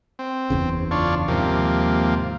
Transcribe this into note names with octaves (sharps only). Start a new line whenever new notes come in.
C4
F#1 E2 C#3
D4 F4 C#5
D#2 G#2 C3 F3 A#3